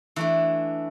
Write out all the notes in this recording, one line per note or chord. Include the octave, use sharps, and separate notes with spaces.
E3 A3 D4